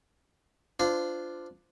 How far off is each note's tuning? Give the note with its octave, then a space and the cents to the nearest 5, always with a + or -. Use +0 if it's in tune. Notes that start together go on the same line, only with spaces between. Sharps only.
D4 +5 F4 -5 C5 -25